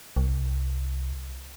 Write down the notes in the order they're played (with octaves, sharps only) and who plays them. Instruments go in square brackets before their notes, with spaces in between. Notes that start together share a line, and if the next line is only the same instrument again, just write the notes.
[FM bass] C2